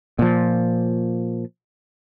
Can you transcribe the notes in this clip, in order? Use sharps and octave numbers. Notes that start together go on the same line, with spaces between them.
A#2 F3